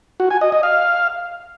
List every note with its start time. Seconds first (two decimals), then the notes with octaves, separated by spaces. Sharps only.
0.20 F#4
0.31 G#5
0.41 D#5
0.52 D#5
0.63 F5